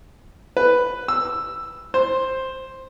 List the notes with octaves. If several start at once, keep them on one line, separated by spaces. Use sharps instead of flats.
B4
E6
C5